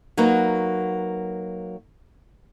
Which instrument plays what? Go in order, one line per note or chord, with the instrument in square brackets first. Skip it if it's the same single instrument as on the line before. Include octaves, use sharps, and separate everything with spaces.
[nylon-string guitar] F#3 A#3 D#4 F#4 B4